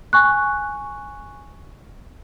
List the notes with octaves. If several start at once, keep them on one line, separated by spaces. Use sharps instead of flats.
G#5 C#6 F#6